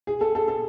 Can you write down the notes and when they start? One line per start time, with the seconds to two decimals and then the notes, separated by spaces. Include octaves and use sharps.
0.07 G#4
0.21 A4
0.35 A4
0.48 A4